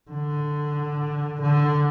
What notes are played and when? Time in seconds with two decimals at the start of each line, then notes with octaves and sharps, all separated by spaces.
0.11 D3
1.42 D3